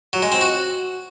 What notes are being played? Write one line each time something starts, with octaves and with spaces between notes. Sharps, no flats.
F#3
G#3
C4
F#4